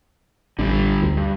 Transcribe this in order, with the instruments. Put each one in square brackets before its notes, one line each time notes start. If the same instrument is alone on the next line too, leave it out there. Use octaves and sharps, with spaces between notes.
[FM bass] A1 [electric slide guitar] D3 G3
[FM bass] D2
[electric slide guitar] G2